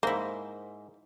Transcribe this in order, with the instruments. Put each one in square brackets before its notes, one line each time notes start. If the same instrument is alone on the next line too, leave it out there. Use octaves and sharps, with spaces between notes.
[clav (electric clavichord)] G#2 [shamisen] A#3 [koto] E4 C5